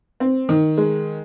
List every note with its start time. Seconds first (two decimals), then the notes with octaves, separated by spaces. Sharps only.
0.20 C4
0.49 D#3
0.78 G#3